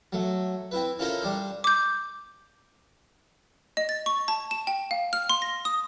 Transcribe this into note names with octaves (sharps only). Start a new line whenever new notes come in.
F#3 A3
C4 E4 B4
C#4 E4 F4 A4 A#4 C5
G3 D4 C5
D6 G6
D#5
A6
C#6
A5
E7
G5
F5
F6
C6
A#6
D#6